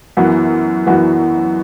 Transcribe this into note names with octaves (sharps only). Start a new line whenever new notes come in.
F#2 E3 B3 F#4
F#2 E3 B3 F#4